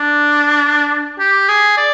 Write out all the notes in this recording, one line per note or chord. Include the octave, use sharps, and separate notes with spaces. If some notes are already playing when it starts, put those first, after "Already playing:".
Already playing: D4
G4
G#4
D5